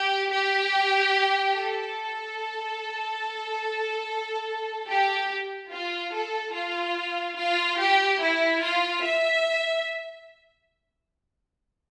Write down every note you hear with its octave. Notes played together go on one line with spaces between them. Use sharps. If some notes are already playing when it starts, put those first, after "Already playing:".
Already playing: G4
G4
A4
G4
F4
A4
F4
F4
G4
E4
F4
E5